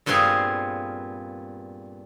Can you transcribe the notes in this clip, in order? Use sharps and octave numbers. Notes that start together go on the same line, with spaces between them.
G2 A#2 B3 C4 G#4 F5